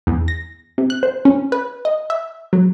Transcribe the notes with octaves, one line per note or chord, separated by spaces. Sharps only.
E2
A#6
C3
F#6
C5
C#4
B4
D#5
E5
F#3